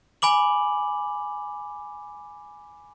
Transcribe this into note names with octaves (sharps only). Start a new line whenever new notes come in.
G#5 B5 D6 F#7